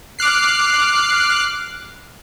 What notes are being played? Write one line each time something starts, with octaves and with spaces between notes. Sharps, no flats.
D6 F6 F#6 C7